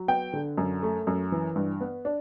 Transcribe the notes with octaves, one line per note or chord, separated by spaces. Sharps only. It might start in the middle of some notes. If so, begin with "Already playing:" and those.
Already playing: F#3
B3 G5
D3
F#2
A3
F#2
E3
G2
B3
D4